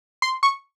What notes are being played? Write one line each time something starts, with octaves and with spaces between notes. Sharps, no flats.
C6
C#6